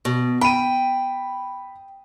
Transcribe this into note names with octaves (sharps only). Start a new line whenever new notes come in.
B2
G5 B5 D#7